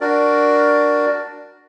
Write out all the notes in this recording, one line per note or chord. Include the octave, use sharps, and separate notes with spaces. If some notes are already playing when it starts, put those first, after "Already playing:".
D4 F#4 A#4 D5